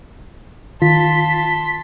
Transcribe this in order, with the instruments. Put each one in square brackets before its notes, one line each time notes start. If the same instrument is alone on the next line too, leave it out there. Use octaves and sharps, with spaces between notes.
[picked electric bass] D#3 [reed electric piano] F4 [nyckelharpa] A5 C6 [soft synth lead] B6